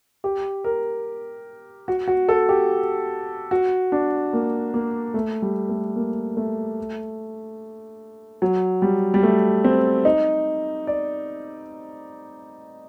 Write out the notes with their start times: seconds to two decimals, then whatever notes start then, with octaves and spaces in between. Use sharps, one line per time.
0.24 G4
0.64 A#4
1.88 F#4
2.07 F#4
2.29 A4
2.49 G4
3.51 F#4
3.92 D4
4.33 A#3
4.74 A#3
5.14 A3
5.42 G3
5.69 A3
5.96 A#3
6.37 A3
8.42 F#3
8.82 G3
9.14 G3
9.23 A3
9.64 C4
10.05 D#4
10.87 D5